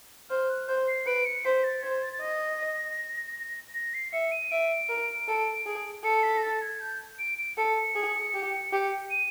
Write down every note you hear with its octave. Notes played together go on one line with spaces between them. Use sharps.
C5 F6
F#6
C5 G6
C7
B4 D7
C#7
C5 B6
A6
C5 G#6
A6
A6
D#5 A#6
A#6
C7
E5 C#7
D#7
E5 D7
A#4
A4
G#4
A4 C#7
B6
A#6
A6
G#6
G6
D7
D7
A4 C#7
G#4
G4
G4
D#7